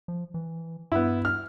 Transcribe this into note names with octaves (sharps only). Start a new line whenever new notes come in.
F3
E3
G2 B3 E4
F6